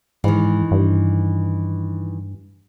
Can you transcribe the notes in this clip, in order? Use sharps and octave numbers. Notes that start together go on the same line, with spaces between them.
G#2 D#3 E3
G2